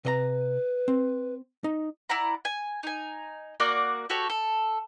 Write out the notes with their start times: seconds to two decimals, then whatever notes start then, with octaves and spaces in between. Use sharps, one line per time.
0.05 C3 B4 D#5 A#5
0.88 C4
1.64 D#4
2.09 E4 D5 F#5 A#5
2.45 G#5
2.83 D#4 G#5
3.60 A#3 F#4 D5 F#5
4.10 F#4 G4 A4 C#5
4.30 A4